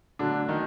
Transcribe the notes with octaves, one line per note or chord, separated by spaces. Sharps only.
B2 D3 F#3 A3 D4
D#3 D#4